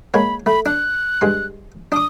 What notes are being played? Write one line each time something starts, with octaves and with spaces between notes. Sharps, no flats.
G#3 A#3 C#5 B5
A3 B5
D4 F#6
G2 G#3 C6
D4 D6 D#6